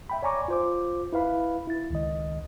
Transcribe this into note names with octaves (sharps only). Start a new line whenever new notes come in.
E5 G5 B5
C#5 D5 G#5 A#5 C#6 D6
F4 C5 D6
E4 B4 F5 B5
E4 A6
C#2 D#3 D#5